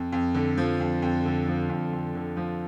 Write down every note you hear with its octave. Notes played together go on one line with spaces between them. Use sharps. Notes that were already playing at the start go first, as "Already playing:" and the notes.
Already playing: F2
F2
D3
F3
F2
F2
D3
F3
F2
F2
D3
F3